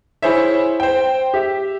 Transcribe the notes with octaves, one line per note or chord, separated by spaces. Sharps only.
E4 G#4 C5 C#5 E5
C5 G5
G4 E5